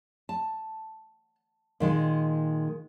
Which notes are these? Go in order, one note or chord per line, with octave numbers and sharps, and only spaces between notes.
A5
A#2 D#3 G#3